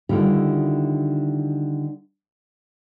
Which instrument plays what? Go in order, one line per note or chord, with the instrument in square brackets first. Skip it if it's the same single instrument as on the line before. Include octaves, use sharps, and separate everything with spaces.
[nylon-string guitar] D3 D#3 G3 E4 F4